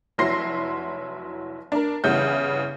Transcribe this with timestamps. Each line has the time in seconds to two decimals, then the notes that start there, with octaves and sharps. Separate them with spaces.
0.18 F1 F#3 E4 C6 A#6 C7
1.72 D4 A#4
2.04 G1 C#3 E3 G3 F#5 G6